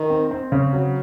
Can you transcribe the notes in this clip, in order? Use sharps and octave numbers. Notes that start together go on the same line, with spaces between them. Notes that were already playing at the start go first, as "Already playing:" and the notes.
Already playing: D#3
C4
C4
C#3
F#3